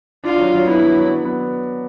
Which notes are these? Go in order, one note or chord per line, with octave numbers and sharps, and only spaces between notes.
D4 F4
F#3
F#3
B3 E4
F#3
F#3
F#3
B3